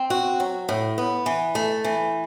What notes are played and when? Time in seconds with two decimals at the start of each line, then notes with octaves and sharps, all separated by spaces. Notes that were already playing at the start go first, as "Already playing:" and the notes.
Already playing: C4
0.10 F#4
0.40 F#3
0.69 A2
0.98 B3
1.26 E3
1.55 A3
1.84 E3